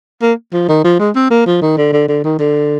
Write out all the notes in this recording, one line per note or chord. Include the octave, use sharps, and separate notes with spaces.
A#3
F3
D#3
F3
G#3
C4
A#3
F3
D#3
D3
D3
D3
D#3
D3